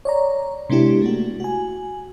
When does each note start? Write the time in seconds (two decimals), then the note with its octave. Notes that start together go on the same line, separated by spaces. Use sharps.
0.05 C#5 D5 A#5
0.70 C3 G#3 B3 D4 E4 G4
1.02 A3 A#3 F#4
1.40 F#4 G#5